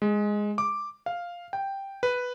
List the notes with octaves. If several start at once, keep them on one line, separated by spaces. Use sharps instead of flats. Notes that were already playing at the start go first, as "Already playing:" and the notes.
G#3
D6
F5
G5
B4